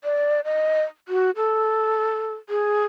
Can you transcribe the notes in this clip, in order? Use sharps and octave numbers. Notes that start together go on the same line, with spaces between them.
D5
D#5
F#4
A4
G#4